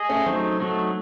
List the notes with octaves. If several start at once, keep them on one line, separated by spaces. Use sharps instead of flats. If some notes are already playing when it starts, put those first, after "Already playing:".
Already playing: G#4 D#5
A3 C#4
F#3 A3 C4 D#4
F#3 A3 D#4